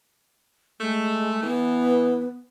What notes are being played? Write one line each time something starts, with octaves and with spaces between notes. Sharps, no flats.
G#3 A3
E3 B3